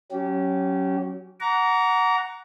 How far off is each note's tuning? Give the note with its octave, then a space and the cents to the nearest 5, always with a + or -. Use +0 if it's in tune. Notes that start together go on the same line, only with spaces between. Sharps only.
F#3 +0 C#4 +0 G4 -25
F#5 +0 A#5 +0 D6 -40